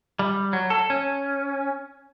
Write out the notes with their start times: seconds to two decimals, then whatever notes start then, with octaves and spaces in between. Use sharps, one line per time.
0.19 G3
0.53 F#3
0.70 A4
0.90 C#4